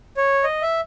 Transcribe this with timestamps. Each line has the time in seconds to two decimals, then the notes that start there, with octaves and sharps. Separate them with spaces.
0.17 C#5
0.44 D#5
0.62 E5